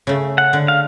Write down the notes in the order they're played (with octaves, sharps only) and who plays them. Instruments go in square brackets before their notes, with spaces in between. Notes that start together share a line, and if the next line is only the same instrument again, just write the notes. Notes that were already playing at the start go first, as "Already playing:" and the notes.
[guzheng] C#3 A3
[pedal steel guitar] F#5
[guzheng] D3
[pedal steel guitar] F5